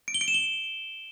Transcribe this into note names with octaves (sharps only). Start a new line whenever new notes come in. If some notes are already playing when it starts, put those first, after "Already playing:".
D7
G7
D7
E7
G7